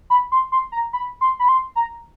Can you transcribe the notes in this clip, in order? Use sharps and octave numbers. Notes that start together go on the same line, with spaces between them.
B5
C6
C6
A#5
B5
C6
B5
C6
A#5